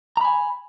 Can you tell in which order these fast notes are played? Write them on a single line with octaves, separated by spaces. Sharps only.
A#5 B5 G#5